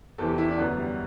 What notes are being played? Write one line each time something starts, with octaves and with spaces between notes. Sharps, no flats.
E2 C3 E3 A4
G4
E4
D4
F#2 D3 B3
G3